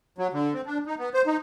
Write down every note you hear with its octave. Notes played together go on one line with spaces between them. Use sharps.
F#3
D3
C4
D4
D#4
B3
C5
D#4